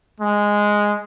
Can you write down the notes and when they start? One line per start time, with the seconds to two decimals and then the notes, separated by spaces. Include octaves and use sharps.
0.20 G#3